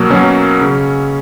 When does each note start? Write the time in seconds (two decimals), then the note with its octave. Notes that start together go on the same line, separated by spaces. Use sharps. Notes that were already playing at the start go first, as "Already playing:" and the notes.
Already playing: B2 F#3 A#3
0.10 B2 F#3 C#4
0.61 C#3